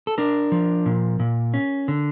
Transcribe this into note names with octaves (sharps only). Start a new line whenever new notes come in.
A4
D4 A#4
F3
A#2
A#2
C#4
D3